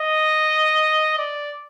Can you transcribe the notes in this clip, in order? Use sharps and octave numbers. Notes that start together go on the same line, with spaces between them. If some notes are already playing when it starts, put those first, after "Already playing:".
Already playing: D#5
D5